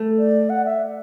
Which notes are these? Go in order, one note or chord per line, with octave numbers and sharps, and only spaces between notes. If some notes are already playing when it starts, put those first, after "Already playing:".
Already playing: A3
D5
F#5
E5